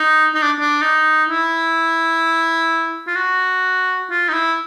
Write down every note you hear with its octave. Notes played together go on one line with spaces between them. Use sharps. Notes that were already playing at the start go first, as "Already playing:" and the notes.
Already playing: D#4
D#4
D4
D4
D#4
E4
F4
F#4
F4
D#4
E4